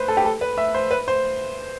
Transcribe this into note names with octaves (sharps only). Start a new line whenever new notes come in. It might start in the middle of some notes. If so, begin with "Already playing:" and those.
Already playing: B4 C5
A4
G4
A4
B4
E5
C5
B4
C5